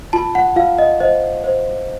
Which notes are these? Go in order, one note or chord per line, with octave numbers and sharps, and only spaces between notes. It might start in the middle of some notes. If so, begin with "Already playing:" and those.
F4 A5
F#5
F4 F5
D#5
C5 D#5
C5